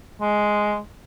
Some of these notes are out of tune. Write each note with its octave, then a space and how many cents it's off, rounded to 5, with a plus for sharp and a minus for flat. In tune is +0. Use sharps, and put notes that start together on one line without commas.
G#3 +5